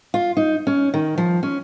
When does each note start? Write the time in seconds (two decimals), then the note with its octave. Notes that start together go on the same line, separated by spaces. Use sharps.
0.14 F4
0.37 D#4
0.67 C#4
0.94 D#3
1.18 F3
1.43 C#4